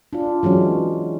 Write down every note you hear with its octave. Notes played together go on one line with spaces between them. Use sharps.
D4 F4
E3 F#3 G#3 C#4